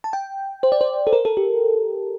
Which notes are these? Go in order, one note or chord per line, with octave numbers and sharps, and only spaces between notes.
A5
G5
C5
D5
C5
A4
A#4
A4
G4